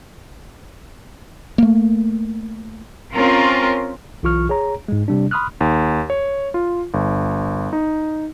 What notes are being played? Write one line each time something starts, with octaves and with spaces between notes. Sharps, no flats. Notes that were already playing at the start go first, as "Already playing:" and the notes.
A3 A#3
C4 C#4 F4 A#4
B1 E3 F4 C#6 F6
G#4 C#5 A#5
G#2 G#3
C3 G3 D4
B5 C6 D#6 F6 F#6
D#2
C#5
F4
G1
D#4